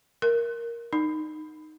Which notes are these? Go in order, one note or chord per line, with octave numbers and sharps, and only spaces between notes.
A#4
D#4